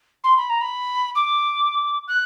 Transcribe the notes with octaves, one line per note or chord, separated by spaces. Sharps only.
C6
B5
A#5
B5
D6
F#6